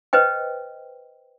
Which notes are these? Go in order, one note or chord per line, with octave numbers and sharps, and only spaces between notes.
B4 C5 D#5 G5